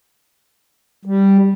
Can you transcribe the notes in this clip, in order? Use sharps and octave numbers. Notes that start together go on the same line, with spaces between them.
G3